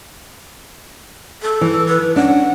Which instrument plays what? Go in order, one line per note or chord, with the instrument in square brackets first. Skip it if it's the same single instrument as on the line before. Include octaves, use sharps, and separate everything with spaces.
[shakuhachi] A4
[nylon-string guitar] E3
[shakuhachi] B4
[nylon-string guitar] C#4 D4 [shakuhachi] F#5